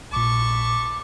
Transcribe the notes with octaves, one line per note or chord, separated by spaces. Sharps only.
A#1 A#2 A5 B5 C#6 D6